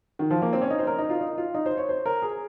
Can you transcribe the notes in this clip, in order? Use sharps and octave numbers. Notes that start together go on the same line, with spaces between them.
D#3
F3
A#3
C4
C#4
D#4
C5
A#4
D#4
F4
D#4
F4
D#4
C5
C#5
C5
A#4
G#4